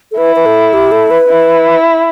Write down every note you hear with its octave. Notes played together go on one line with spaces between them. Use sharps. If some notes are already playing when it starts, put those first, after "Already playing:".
A4
E4 B4
B4
A4
G4
A4
B4
E4